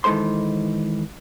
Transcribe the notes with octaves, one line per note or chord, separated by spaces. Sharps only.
D#3 E3 G#3 A4 C5 C6